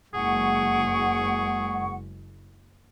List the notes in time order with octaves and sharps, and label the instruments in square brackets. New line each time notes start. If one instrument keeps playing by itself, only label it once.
[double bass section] F#1 G#3 [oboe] G#4 [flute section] F#5 C#6